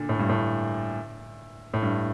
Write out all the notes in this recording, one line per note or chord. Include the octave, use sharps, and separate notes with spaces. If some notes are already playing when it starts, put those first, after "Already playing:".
Already playing: A#2 D3
A2
G2
A2
A2
G2